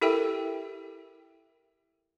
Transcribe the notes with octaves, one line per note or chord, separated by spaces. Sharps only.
E4 G4 A4 A#4 E5 G5